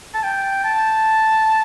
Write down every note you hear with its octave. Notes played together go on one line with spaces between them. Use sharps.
A5
G5
A5